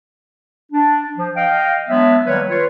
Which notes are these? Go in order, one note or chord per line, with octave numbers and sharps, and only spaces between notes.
D4
F3
D#5 F5 G5
F#3 G#3 B3 D4 E5
D#3 F#3 G3 A#3 B4 C#5
F4 B4 C#5